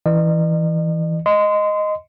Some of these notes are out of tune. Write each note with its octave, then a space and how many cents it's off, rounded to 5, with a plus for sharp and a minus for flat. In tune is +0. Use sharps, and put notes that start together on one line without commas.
E3 -10 D#5 -45
D#5 +0 C6 -25